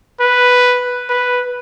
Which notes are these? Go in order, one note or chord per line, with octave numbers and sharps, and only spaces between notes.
B4
B4